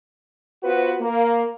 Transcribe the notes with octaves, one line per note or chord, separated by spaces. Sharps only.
B3 F4 F#4 B4 C5
A#3